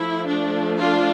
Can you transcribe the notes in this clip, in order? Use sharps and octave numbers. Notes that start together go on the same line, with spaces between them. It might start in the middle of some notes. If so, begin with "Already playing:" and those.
Already playing: F3 A3 E4
D4
D4 F4